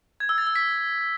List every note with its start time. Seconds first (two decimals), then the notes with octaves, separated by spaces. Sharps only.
0.20 G#6
0.29 E6
0.38 A6
0.47 E6
0.56 B6